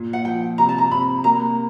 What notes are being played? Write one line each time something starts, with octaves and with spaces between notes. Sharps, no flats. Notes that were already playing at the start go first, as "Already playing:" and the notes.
Already playing: A#2
F#5
F3 G5
C3 A#5
A5
A#5
C3 B5
A#3 A#5